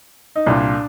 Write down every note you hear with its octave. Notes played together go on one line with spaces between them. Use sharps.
D#4
C2 A#2 D4